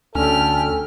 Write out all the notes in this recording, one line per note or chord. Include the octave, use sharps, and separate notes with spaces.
D2 C#4 G4 A4 F6